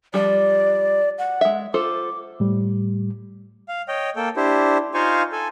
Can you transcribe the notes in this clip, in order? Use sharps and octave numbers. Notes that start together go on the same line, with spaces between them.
F3 G3 D5
F#5
G#3 E5
F4 A4 C5 D6
A2 G3
F5
C#5 D#5 G5
A#3 A4 G5
D4 E4 G4 C5
D#4 F4 C5 F5 G#5 C#6
A4 G#5